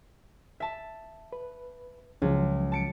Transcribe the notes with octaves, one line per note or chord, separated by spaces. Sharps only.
E5 A5
B4
C#2 F3 F#3 C#4
A5 C#7 D7